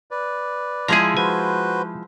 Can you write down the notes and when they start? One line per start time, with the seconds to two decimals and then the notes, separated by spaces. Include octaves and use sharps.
0.11 B4 D5
0.88 F3 G#3 E4 G#4 A#5
1.17 F#4 B4 C5 G#5